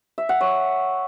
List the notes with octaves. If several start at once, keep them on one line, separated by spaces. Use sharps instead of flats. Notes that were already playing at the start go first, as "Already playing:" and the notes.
E5
F#5
C#5